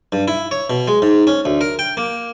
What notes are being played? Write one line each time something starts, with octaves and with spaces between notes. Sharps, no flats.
G2
E4
C#5
B2
G#3
G#2
C#4
D2
A#4
G5
A#3